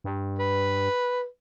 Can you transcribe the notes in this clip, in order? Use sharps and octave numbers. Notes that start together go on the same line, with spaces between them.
G2
B4